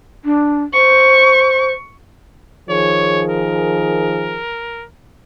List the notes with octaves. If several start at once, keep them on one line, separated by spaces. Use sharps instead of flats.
D4
C5 C#6
D#3 F3 G#4 C#5
A#4